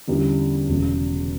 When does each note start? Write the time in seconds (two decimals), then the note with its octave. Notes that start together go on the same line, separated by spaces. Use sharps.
0.07 E2 D3 G3 C#4 E4
0.69 E1 E2 C#3